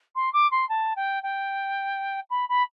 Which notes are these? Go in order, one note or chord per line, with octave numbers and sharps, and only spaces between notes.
C6
D6
C6
A5
G5
G5
B5
B5